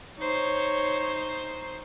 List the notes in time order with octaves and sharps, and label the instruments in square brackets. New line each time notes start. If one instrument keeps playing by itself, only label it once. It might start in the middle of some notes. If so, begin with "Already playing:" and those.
[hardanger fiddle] D#4 C5 [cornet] C#5